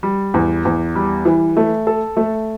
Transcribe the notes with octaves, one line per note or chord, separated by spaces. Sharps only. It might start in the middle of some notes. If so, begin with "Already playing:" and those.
G3
E2
E2
G3
E3
A3
A4
A3